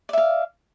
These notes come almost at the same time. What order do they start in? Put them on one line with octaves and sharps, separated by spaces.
D5 E5 F5